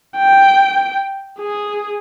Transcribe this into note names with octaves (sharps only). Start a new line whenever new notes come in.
G5
G#4